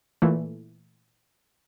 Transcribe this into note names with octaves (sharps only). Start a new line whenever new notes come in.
A#2 E3 A3